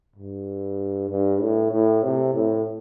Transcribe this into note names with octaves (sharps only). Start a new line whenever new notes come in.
G2
G2
A2
A2
C3
A2